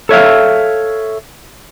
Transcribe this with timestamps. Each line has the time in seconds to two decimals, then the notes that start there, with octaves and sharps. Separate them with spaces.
0.09 A4 C#5 E5 F5